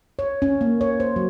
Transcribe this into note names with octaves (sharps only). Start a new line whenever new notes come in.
C#5
C#4
A#3
C#5
C5
F#3